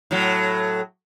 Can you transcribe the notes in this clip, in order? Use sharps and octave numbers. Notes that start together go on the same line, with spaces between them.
A2 F#3